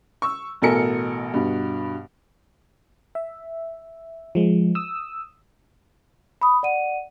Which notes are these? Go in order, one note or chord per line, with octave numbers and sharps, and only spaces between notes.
C#6 E6
A1 B2 A4 A#4 G#5 C#7
G2 B2
E5
F3 G#3
D#6 E6
B5 D#6
D5 F#5 D#7